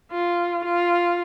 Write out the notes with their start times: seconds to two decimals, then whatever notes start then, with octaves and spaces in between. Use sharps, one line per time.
0.11 F4
0.64 F4